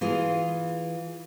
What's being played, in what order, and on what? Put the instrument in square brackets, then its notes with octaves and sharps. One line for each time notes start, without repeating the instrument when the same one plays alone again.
[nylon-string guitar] E3 F4 G#4